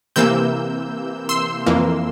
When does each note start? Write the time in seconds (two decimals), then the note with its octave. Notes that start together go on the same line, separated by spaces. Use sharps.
0.16 C3 E3 A#3 E6 G6
1.29 C6 E6
1.66 F2 E3 A#3